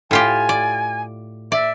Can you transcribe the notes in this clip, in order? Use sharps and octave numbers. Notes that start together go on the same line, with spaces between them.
A2 F4 G4 G#5
D5
D5 E5